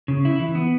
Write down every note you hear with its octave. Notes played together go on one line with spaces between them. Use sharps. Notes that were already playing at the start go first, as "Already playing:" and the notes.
C#3
E4
E3
B3